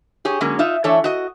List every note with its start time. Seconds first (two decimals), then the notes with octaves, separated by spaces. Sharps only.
0.25 G4 G#4 C#5
0.41 D3 F#3 G#3 A#3 C#4
0.59 D#4 F4 D#5 E5
0.84 E3 A3 D4 A4 C#5
1.04 F#4 D#5